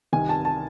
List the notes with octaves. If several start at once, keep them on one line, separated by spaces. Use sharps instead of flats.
C2 C3 D#3 G#5
A5
A5